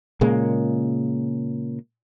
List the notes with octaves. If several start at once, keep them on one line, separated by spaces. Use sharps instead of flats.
A#2 C#3 G#3 A#3